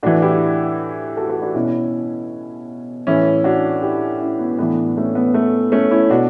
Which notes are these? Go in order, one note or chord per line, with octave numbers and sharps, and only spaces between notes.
A2 E3 D4 F#4
E4 G4
F#4 A4
F#4 A4
D4 F#4
B2 C#4 E4
A2 E3 C#4 E4
D4 F#4
E4 G4
C#4 E4
B3
A2 E3 B3 D4
A3 C#4
B3
A3
A3 C#4
C#4 E4
B2 D4 F#4